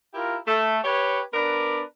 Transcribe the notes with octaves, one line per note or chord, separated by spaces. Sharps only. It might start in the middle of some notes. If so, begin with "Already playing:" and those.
E4 F4 G4 A#4
A3
G4 B4 C#5
B3 D4 A#4 B4 D5